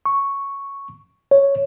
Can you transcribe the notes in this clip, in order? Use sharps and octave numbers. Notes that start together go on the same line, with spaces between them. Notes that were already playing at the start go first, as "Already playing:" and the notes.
C#6
C#5